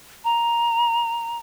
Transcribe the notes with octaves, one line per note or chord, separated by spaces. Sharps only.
A#5